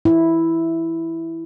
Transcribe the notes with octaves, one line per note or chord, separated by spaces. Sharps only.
E4